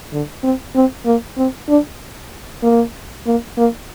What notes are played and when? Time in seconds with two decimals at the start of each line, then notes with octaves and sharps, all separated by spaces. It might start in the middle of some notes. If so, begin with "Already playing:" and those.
0.12 D3
0.44 C4
0.75 C4
1.06 A#3
1.37 C4
1.69 D4
2.63 A#3
3.26 A#3
3.57 A#3